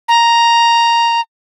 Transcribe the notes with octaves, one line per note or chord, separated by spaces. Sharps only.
A#5